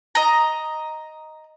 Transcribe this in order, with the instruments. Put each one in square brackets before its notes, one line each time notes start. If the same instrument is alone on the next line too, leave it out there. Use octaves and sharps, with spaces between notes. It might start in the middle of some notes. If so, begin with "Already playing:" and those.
[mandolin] D#5 A#5